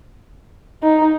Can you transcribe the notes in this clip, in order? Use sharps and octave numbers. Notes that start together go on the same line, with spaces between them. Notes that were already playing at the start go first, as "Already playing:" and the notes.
D#4